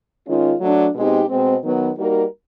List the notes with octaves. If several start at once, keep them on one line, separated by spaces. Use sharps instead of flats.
D#3 G#3 C#4 F4
F#3 A3 D4
B2 G#3 C4 D#4 G4
B2 G#3 C4
D#3 F#3 B3
G3 A#3 D#4 F#4 A#4